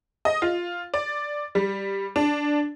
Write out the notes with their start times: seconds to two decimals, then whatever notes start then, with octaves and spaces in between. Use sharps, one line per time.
0.25 D#5
0.42 F4
0.94 D5
1.55 G3
2.16 D4